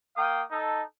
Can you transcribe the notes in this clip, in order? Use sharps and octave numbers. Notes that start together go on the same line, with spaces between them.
A#3 F5 G5 D#6
D#4 A4